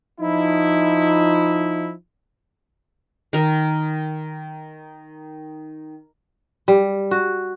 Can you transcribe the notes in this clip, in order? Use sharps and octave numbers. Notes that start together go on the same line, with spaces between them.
F3 D#4 E4
D#3 A#4
G3
F#4